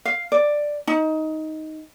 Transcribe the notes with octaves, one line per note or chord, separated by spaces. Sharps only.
F5
D5
D#4